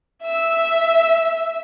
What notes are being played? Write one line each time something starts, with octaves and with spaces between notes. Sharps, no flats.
E5 E6